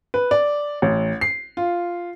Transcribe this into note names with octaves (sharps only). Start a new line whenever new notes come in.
B4
D5
A1
C7
F4